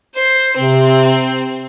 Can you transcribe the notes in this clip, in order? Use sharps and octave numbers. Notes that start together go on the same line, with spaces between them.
C5
C3 C4